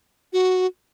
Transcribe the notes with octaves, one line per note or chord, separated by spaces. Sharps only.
F#4